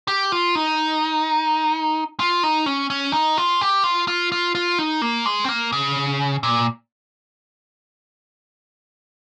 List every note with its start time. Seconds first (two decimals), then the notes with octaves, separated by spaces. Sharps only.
0.08 G4
0.32 F4
0.55 D#4
2.20 F4
2.43 D#4
2.66 C#4
2.90 C#4
3.13 D#4
3.38 F4
3.61 G4
3.84 F4
4.08 F4
4.32 F4
4.55 F4
4.79 D#4
5.02 A#3
5.26 G#3
5.44 C4
5.49 A#3
5.72 C#3
6.43 A#2